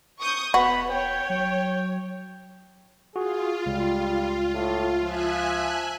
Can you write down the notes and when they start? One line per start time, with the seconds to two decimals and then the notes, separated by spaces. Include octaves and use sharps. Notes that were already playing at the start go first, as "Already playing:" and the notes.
0.20 C#6 D#6 G6
0.54 E1 B3 F#4 B5
0.91 C#5 G5
1.30 F#3 G5
3.16 F4 F#4 G#4
3.66 C#2 G3
4.54 A2
5.02 F3 E5 G#5 F#6